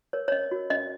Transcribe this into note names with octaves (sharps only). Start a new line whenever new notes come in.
A#4 C#5
C#5
C#4 D#5
F#4 A#4
C#4 D#5